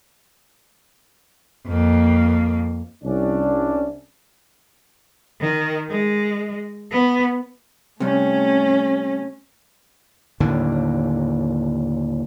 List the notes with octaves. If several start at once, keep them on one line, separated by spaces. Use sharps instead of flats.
F2 A#3
C2 C#4 D4
D#3
G#3
B3
C3 G3 A3 C#4
D#2 A2 D3